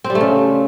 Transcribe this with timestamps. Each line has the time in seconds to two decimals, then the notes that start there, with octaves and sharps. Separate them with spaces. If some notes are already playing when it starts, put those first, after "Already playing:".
0.04 C4
0.10 G3
0.15 A3
0.21 C#3